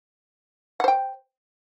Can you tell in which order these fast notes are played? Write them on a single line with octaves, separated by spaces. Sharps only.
F#5 C5 G5